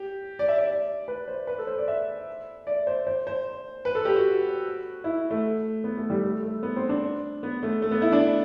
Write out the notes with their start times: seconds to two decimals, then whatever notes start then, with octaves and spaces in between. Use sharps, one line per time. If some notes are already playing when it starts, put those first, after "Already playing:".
Already playing: G4
0.39 D5
0.48 E5
0.58 D5
1.08 B4
1.28 C5
1.47 B4
1.58 A4
1.67 C5
1.78 D5
1.88 E5
2.67 D5
2.87 C5
3.07 C5
3.27 C5
3.85 B4
3.95 A4
4.05 G4
4.16 F#4
5.04 E4
5.30 A3
5.84 B3
5.97 A3
6.10 G3
6.24 A3
6.43 A3
6.63 B3
6.76 C4
6.89 D4
7.43 B3
7.63 A3
7.82 A3
7.91 B3
8.02 E4
8.12 D4